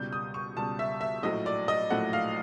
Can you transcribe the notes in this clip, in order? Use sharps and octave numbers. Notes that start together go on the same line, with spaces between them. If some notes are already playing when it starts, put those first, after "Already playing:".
Already playing: C#2 B2 G3 G6
D#6
C#6
C#2 B2 G3 A5
E5
E5
A#1 A2 F#3 A3 D#5
D5
D#5
A#1 A2 F#3 A3 F#5
F5